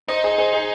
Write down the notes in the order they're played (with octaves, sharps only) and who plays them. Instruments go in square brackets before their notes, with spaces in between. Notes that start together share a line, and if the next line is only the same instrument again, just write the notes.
[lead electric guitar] D#4 [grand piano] C5 D#5
[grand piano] G#4 C5
G#4 C5
G#4